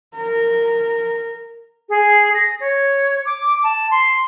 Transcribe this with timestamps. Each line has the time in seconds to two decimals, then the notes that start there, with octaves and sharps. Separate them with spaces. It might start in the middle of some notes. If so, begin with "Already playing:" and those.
0.16 A#4
1.89 G#4
2.34 A#6
2.60 C#5
3.26 D6
3.63 A5
3.91 C6